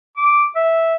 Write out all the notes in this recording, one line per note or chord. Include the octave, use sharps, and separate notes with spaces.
D6
E5